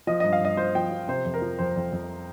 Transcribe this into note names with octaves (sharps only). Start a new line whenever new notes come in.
F3 D#5
D#5
G2
F5
G2 D#5
F3 C5
F3 G5
F3
C3 C5
F2
A#4
F3
F2 C5
F2
F2